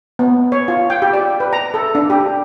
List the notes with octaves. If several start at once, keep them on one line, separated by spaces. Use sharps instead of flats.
B3
C#5
F4
G5
G4
D5
B4
A#5
A4
D4
G4